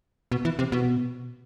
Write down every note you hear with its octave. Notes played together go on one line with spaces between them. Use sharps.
B2
E3
C3
B2